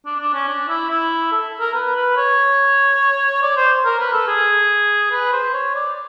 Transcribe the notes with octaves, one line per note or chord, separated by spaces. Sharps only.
D4
D4
C#4
D4
E4
E4
A4
A#4
B4
B4
C#5
D5
C5
A#4
B4
A4
G#4
B4
C5
C#5
D5